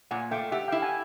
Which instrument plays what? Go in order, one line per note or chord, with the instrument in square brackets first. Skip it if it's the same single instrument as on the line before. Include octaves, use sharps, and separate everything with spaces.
[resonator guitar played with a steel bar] A#2 [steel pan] F#5 G#5
[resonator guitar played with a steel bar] A3 [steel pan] F5 G5
[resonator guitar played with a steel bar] G4 [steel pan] E5 F#5
[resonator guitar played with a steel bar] E4 [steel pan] F5 G5
[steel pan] F#5 G#5